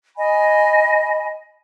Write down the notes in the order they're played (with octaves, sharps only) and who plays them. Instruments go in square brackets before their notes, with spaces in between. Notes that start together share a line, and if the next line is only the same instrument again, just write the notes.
[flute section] D#5 G#5 B5